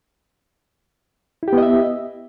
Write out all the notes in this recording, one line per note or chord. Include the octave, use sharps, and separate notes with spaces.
B3 E4 G4 D#5 E5